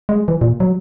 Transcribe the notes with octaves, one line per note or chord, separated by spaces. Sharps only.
G#3
E3
A#2
F#3